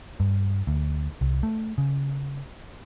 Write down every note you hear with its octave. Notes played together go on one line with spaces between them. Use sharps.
G2
D2
C2
A3
C#3